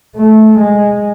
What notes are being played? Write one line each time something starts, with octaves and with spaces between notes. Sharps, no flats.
A3
G#3